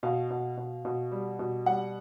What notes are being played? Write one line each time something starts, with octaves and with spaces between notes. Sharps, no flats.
B2 F5
B2
B2
B2
G3
B2
G3 F#5